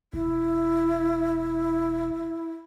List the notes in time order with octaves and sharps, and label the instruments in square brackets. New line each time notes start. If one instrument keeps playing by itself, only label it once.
[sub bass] E1 [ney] E4